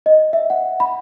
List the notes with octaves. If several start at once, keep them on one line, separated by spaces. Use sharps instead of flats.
D#5
E5
F#5
B5